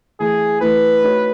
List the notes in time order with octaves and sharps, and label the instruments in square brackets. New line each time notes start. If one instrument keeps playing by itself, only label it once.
[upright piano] E3 A3 E4 [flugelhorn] G#4
[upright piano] E3 A3 E4 [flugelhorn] B4
[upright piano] A3 D#4 F#4 C#5